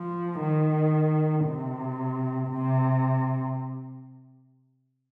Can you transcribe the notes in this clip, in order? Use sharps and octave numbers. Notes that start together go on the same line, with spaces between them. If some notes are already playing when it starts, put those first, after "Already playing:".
Already playing: F3
D#3
C3
C3